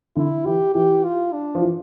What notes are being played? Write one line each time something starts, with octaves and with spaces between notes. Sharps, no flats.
D3 E4
E3 G4
E3 G4
F4
D4
F3
E3